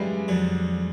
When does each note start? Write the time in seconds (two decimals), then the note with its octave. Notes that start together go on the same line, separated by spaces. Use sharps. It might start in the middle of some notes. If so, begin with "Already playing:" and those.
Already playing: F#2 C#3 E3 G3 G#3
0.28 F2 D3 F#3